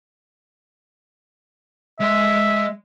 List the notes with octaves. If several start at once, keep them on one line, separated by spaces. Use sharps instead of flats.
G#3 E5 C6